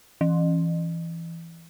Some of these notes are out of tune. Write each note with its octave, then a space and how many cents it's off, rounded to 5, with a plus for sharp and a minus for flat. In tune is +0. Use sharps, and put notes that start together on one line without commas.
E3 +15